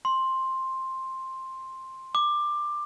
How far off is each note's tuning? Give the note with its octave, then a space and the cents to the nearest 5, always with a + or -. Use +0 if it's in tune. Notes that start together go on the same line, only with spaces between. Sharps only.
C6 +10
D6 +15